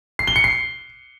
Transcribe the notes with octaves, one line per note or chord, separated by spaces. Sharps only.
C7
G7
C#7
C7